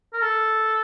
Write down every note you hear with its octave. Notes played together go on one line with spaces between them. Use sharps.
A#4
A4